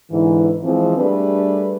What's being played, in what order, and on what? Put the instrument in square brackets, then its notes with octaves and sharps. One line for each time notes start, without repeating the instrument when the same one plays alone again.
[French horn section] G#2 D3 E3
E3 F3 G#3 C4
G3 A3 D4 G#4 B4